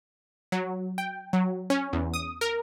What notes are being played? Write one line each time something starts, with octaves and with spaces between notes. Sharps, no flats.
F#3
G5
F#3
C#4
E2
D#6
A#4